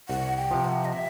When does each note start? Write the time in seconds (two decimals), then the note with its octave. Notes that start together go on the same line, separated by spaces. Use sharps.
0.09 C2 F#5
0.37 G5
0.51 C3 F3
0.64 F#5
0.85 D#5
0.93 E5